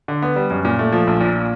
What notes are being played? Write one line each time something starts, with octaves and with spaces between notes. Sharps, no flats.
D3
B3
G3
F#2
A#2
A3
F3
A#1
A#2